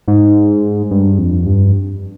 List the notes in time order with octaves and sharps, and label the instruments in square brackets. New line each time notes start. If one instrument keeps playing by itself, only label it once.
[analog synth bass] G#2
G2
F2
G2